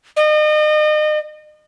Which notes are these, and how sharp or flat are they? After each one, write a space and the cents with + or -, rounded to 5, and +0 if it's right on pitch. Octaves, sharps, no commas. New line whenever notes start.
D#5 -35